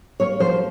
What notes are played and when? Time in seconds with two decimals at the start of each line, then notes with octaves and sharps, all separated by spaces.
0.20 A#3 C#5
0.40 F3 C5